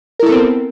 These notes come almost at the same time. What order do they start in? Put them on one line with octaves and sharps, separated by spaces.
A#4 E4 A4 B3 C4